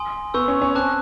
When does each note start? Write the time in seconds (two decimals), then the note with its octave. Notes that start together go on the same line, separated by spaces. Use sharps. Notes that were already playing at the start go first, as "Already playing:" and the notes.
Already playing: G#5 C6 D#6
0.34 B3 C#6 E6 G6
0.48 C#4
0.62 C#4
0.75 C4 A5 D6 F#6